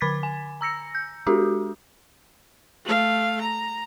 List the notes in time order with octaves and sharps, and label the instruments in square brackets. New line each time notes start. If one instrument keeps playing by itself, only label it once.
[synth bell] D3 B5 D6 G#6 A6 B6
G#5
A#5 E6 A#6 C#7
G6
G#3 D4 F#4 G4 A4
[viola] A3 F5
A#5